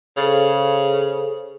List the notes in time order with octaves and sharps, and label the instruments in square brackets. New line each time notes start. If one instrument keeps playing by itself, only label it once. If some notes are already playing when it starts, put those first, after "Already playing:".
[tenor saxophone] C#3 [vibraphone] G#4 A4 C5